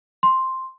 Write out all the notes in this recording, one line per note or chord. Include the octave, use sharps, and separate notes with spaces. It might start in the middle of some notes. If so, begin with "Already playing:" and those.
C6